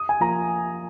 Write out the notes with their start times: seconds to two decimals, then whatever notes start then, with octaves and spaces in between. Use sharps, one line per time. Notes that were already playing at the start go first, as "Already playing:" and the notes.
Already playing: D#6
0.09 G#5
0.20 F3 A#3 F4 A#5